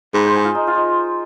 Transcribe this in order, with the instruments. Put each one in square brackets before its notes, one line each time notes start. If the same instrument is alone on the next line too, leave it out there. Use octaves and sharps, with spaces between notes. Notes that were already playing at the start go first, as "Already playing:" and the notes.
[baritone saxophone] G#2 [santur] B4
[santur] C5
G#4
F4
D#4
F4
D#4